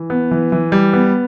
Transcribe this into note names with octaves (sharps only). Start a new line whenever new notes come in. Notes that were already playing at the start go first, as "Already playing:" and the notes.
Already playing: E3
B3
E3
E3
G3
B3